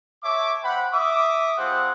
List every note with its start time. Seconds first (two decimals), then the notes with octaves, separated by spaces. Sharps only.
0.23 A4 C#5 E5 D6
0.63 A3 C5 F#5 G5 B5
0.93 E5 D6 D#6
1.58 G3 C4 F4 G#4 C5 F#5